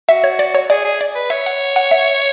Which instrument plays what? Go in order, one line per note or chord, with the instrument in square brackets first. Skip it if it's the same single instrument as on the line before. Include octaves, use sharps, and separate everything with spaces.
[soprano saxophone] F#4 [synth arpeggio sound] E5
[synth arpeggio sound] C#5
D5
C#5
[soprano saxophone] G#4 [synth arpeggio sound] D5
[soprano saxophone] G#4
[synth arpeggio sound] D5
[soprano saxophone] B4
[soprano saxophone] C#5 [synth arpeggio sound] E5
[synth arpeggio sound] F#5
F#5
E5